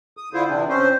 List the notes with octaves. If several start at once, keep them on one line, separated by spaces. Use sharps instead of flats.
D#6
D3 E4 F4 C5
C3 E3 C4 D4
C4 C#4 C5